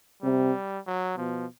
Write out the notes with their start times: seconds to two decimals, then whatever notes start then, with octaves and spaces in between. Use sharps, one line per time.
0.22 C3 G3
0.87 F#3
1.17 B2 F3